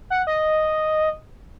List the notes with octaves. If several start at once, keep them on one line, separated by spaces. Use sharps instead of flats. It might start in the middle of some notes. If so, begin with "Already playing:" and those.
F#5
D#5